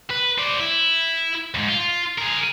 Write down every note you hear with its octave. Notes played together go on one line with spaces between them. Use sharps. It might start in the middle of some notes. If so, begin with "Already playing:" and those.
B4
C5 D5
E4
D#2 G#2
F4
G#4 A#4